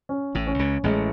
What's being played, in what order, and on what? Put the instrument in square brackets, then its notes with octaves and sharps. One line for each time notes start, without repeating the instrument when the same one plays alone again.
[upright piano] C#4
[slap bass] A1 A2
[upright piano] C#4
[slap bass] C#2 C#3
[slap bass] A1 A2 [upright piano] G#3